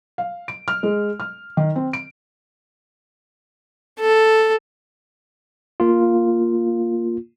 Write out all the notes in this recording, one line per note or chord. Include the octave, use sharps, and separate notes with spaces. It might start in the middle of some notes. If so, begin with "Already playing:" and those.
F5
D7
F6
G#3
F6
D#3
C4
D7
A4
A#3 F4